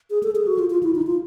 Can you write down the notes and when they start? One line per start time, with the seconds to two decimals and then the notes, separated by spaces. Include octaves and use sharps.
0.10 G#4
0.23 A4
0.35 G#4
0.47 F#4
0.59 F4
0.70 F4
0.83 E4
0.95 D#4
1.02 E4
1.07 F4